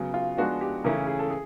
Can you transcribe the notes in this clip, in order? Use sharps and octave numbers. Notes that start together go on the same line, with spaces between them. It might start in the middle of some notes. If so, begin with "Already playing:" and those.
Already playing: C#3 F#3 B3
F4
F3 G#3 B3 D4 F#4
G4
C#3 E3 A3 C#4 E4 A#4
G#4
A4
G#4